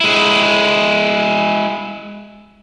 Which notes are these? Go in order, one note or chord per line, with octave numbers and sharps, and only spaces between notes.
G#3 E4